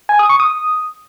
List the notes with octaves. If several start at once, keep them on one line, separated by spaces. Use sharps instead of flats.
G#5
D#6
C#6
D#6